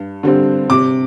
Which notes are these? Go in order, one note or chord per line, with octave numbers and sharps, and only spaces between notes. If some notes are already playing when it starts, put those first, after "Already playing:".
Already playing: G2
D3 G3 C4
C3 D6